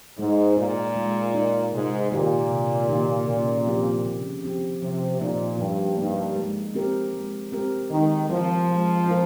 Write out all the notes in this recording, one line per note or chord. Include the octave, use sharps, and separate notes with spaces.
G#2 G#3
A#2 D#4 A#4
G#3
D#4 A#4
G#2 C3
A#2 D#3 A#3 D#4 G4
C3
D#3 A#3 D#4 G4
C#3
F3 C4 G4
C#3
F3 C4 G4
C3 F3
A#2 A#3 D#4
G2 F3
G2 A#3 D#4
G#3
C4 G4 A#4
G#3
C4 G4 A#4
D#3 G#3
F3 C4 F4 A#4
G#3
C4 F4 A#4